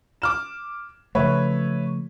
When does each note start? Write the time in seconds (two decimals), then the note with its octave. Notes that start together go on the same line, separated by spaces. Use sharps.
0.22 D6 F6 E7
1.15 C#3 F3 A3 B4 C#5 E5